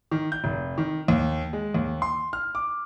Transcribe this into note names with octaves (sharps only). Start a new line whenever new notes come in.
D#3
G6
F1
D#3
D#2
G#3
D#2
C6
F6
D6